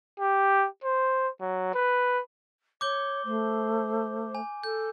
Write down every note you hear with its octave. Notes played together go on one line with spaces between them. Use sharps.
G4
C5
F#3
B4
C#5 D6 G6 G7
A3 C5
G#5
A4 G6